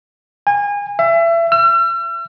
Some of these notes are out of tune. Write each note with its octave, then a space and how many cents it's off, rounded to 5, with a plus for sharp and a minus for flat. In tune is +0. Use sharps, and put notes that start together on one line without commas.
G#5 -30
E5 +30
E6 +45